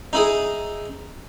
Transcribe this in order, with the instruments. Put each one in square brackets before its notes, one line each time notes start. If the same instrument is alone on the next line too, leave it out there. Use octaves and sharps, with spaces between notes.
[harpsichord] D#4 E4 G#4